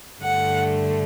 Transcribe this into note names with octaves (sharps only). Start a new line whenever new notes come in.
G2 D3 A3 F#5